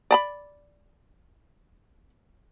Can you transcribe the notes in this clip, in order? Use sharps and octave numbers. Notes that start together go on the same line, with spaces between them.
D5 A#5 B5